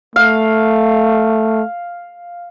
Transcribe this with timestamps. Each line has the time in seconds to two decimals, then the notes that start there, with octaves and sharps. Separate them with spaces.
0.16 A3 F5